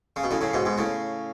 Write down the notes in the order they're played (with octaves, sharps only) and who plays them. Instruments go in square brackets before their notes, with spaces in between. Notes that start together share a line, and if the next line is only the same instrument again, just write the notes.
[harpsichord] C#3
B2
A2 C#3
A2 C#3
G#2 B2
G#2 B2
A2 C#3